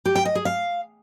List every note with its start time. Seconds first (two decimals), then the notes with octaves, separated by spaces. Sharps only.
0.06 G4
0.15 G5
0.25 D#5
0.35 G#4
0.45 F5